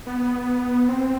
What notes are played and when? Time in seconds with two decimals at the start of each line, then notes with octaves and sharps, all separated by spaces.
0.07 B3
0.88 C4